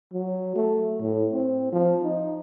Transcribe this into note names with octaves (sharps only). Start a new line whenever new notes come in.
F#3
A3
A2
C4
F3
D#4